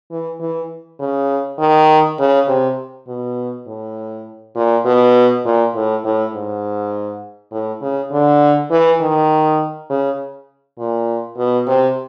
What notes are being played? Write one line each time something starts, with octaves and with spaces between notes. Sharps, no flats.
E3
E3
C#3
D#3
C#3
C3
B2
A2
A#2
B2
A#2
A2
A2
G#2
A2
C#3
D3
E3
D#3
C#3
A#2
B2
C3